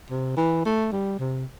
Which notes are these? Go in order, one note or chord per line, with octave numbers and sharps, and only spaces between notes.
C3
E3
A3
G3
C3